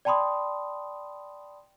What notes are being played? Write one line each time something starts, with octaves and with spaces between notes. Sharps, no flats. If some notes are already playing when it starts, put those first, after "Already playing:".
D5 G5 A5 B5 C6 D#6